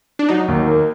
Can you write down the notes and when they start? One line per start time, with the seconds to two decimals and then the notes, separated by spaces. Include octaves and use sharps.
0.19 D4
0.29 F#3 D#4
0.48 D#2
0.67 A#3